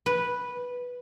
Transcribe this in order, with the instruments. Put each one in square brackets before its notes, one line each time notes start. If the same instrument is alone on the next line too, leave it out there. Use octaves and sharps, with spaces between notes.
[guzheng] B4